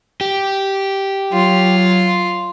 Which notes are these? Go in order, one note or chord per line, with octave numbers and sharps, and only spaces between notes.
G4
F#3 F4